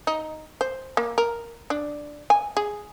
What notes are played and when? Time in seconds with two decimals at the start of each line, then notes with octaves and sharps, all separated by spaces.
0.07 D#4
0.61 C5
0.97 A#3
1.18 A#4
1.70 D4
2.30 G#5
2.57 G#4